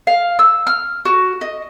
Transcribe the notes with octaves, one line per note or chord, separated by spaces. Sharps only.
F5
E6
F6
F#4
D#5